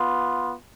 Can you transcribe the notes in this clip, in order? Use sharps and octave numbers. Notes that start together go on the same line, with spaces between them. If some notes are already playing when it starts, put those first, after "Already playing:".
Already playing: B3 F4